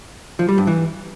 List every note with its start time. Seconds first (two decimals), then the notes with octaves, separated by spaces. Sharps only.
0.39 F3
0.49 G3
0.58 G2
0.67 E3